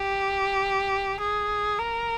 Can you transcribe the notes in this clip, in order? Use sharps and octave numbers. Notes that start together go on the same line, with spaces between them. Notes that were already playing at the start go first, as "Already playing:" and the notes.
Already playing: G4
G#4
A#4